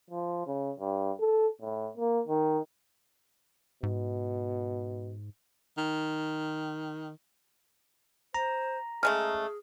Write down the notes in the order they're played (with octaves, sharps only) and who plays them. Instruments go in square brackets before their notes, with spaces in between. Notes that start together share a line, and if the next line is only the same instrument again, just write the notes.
[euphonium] F3
C#3
G2
A4
A2
A#3
D#3
[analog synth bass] G#2 [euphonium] B2
[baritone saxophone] D#3
[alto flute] C5 [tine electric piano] A#5
[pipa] C#3 G#3 A3 [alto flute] G#4 [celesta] F6